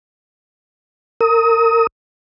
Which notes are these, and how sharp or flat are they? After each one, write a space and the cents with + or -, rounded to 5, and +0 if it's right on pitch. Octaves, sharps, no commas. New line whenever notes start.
A#4 -25 D#6 +30